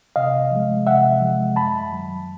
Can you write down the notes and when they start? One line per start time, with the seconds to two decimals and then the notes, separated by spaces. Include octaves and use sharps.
0.16 C3 D#5 F5
0.51 F3 G#3
0.87 C3 E5 F#5
1.21 F3 G#3
1.56 F#2 A5 B5
1.92 D#3 F#3